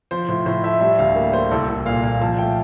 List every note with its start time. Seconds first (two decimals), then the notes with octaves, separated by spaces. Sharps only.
0.11 F3 C5
0.28 A2 C5
0.46 A2 C5
0.63 A3 E5
0.81 G3 E5
0.99 D2 F5
1.16 A#3
1.33 A#3 C5
1.51 C2 A4
1.68 C2 A4
1.86 A#2 F5
2.04 A#2 F5
2.21 F3 A5
2.38 A3 G5